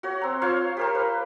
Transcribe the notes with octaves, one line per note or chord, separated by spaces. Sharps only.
F#4 C#5
C4 A#5
F4 C5 C#5 F5
G4 A#4 C5
B4